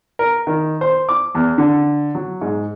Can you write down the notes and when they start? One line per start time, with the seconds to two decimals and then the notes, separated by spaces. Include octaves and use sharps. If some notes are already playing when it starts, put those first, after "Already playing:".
0.19 A#4
0.47 D#3
0.81 C5
1.09 D6
1.35 E2
1.58 D3
2.15 F#3
2.41 G#2